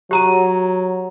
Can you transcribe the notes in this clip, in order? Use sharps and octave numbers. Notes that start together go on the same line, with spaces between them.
F#3 G4 A#5 D#7